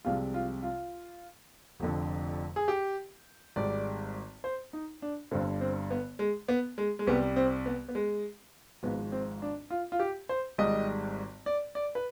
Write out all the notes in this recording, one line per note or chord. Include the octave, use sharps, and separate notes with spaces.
C2 C3 F3 G#3 F4
F4
F4
F1 F2 D3
G#4
G4
G#1 G#2 G3 D5
C5
D#4
D4
G1 G2 D3 C4
C4
B3
G#3
B3
G#3
G#3
C2 C3 G3 B3
C4
B3
B3
G#3
G#1 G#2 F3 B3
C4
D4
F4
F4
G4
C5
G#1 G#2 G3 D#5
D5
D5
B4